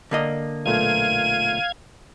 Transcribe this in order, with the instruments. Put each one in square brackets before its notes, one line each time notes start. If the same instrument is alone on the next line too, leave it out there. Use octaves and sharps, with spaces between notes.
[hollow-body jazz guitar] D3 A#3 D#5
[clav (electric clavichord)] B1 A#2 A3 [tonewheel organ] F5 G#6 [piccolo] D#7